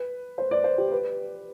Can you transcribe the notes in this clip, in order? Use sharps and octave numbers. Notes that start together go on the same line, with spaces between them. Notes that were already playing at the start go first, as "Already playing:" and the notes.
Already playing: B4
C5
D5
C5
G4
B4